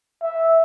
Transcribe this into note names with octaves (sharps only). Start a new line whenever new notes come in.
E5